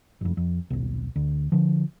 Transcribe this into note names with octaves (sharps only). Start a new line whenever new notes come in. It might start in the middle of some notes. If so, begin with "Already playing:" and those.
F#1 F2
F2
D#1 B1
D2
D3 F3